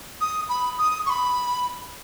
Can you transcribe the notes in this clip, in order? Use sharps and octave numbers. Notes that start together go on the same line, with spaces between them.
D#6
B5
D#6
C#6
B5